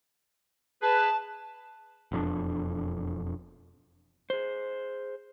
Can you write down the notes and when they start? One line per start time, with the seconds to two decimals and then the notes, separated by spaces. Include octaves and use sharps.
0.83 G#4 B4 A5
2.12 E1 F2 D4
4.30 G#4 C5